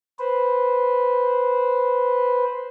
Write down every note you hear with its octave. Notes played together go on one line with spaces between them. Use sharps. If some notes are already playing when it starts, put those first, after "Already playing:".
B4 C5